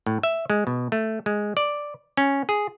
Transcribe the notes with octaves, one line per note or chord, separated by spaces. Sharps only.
A2
E5
G#3
B2
A3
G#3
D5
C#4
G#4